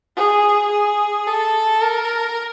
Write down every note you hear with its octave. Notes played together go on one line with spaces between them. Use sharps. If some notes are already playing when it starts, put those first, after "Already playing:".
G#4
G#4
A4
A#4